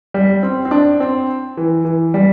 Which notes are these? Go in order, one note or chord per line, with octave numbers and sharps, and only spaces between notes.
G3
C4
C4
D4
C4
E3
E3
G3